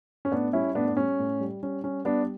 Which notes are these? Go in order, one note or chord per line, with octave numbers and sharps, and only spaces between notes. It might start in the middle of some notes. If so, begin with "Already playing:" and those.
C#4
A2 B3 D4
G3 C#4 E4
A2 B3 D4
B3
G3 C#4
A2
G3
G3 C#4
G3 C#4
G3 B3 D4